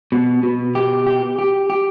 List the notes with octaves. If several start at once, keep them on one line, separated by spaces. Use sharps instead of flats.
B2
B2
G4
G4
G4
G4